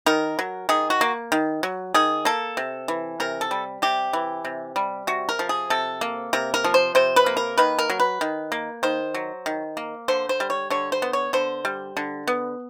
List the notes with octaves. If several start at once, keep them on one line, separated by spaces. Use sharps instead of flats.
D#3 A#4
F#3
D#3 G#4
F#4
A#3
D#3
F#3
D#3 G#4
A#3 A4
C3
E3
C3 A#4
A4
G3
C3 G4
E3
C3
G3
C3 F#4
A#4
F3
G#4
C3 A4
A#3
C3 A#4
A#4
F3
C5
C3 C5
B4
A#3
A#4
D#3 B4
A#4
F#3
B4
D#3
A#3
D#3 C5
F#3
D#3
A#3
D3 C5
C5
G3
C#5
D3 C#5
C5
B3
C#5
D3 C5
G3
D3
B3